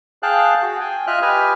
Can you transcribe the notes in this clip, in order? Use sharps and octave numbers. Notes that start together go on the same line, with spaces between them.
G#4 F5 G5 A5 F#6
F#4 G#4
G5 G#5
F4 D#5 E5 F6 F#6
G4 B4 D#5 G#5 F6